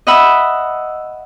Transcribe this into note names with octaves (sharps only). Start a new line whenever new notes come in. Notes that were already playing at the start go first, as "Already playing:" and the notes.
D#5 E5 F#5 B5 E6